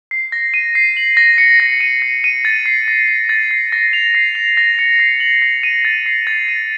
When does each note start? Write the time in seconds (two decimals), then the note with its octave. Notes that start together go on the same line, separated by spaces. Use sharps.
0.11 C7
0.32 A#6
0.54 D#7
0.75 C7
0.97 F#7
1.17 A#6
1.38 C#7
1.60 A#6
1.81 D#7
2.02 A#6
2.24 D#7
2.45 A6
2.66 C7
2.88 A#6
3.08 D#7
3.29 A6
3.51 C7
3.72 A#6
3.93 F7
4.15 C7
4.35 F7
4.57 A#6
4.79 C#7
4.99 C7
5.20 F#7
5.42 A#6
5.63 D#7
5.85 A6
6.06 C7
6.27 A6
6.48 D#7